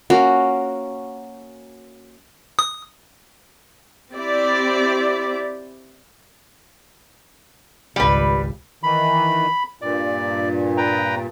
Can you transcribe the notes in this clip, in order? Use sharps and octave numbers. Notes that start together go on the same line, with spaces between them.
A#3 C#4 F#4
D#6
C4 E4 G4 D5
G#1 C#2 G3 B4
D#3 E3 B5
G2 A#2 D5
B4 G5 A#5